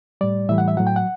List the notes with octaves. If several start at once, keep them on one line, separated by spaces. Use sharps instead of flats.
A2 G3 D5
A2 E3 G3 E5
F#5
E5
A2 F#3 F#5
G5
F#5